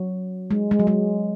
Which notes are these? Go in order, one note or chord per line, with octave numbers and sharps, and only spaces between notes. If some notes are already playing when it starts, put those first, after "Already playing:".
Already playing: F#3
G#3
G#3
F#3
G#3